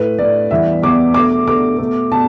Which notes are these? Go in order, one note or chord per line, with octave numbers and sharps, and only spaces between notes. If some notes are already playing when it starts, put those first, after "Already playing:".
Already playing: A2 A3 B4
A2 A3 D5
E2 E3 G3 B3 E5
E2 E3 G3 B3 D6
B2 A3 D6
B2 A3 D6
B2 A3
B2 A5